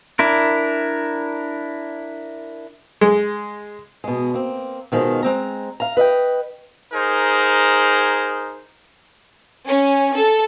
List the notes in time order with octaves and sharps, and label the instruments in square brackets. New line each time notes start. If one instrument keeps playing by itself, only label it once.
[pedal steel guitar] D4 E4 A#4
[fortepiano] G#3
[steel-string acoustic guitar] B2 G#3
A#3 C4
B2 D#3 F3 G#3
G#3 C4 A#5
F5 A#5
B4 D#5 E5 G5
[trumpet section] D#4 G#4 A#4 C5
[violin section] C#4
A4